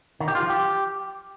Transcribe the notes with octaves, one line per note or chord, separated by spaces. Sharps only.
D#3
G4
F4
F3
G4